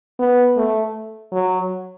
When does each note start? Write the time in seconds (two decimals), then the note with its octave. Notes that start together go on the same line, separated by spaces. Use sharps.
0.19 B3
0.57 A3
1.32 F#3